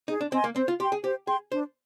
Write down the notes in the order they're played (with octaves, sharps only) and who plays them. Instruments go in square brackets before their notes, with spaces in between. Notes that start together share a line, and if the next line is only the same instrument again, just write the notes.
[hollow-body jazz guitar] D#4 [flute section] G#4
[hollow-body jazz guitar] D4
[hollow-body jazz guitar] C4 [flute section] D#5 G#5 C6
[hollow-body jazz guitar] A#3
[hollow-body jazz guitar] C4 [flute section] C5
[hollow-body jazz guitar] F4
[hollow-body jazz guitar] G4 [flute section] G5 C6
[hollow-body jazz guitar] G#4
[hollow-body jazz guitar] G4 [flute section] C5
[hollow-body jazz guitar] G#4 [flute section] G5 C6
[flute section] D4 [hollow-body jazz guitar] C5